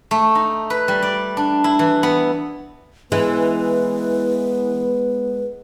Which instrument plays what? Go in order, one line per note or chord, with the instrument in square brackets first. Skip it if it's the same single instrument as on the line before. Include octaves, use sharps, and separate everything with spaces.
[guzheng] A3
D#4
B4
G3
D5
D4
E4
E3
B3
[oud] E3 [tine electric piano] G#3 [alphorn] B3 [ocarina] B4